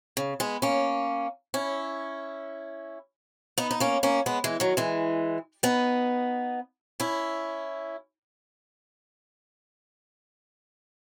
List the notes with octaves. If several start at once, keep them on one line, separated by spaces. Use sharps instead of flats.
C#3
G#3 B3
A#3 C#4
C#4 E4
B3 D#4
D#4
A#3 C#4
A#3 C#4
G#3 B3
E3 G#3
D#3 F#3
E3 G#3
B3 D#4
C#4 E4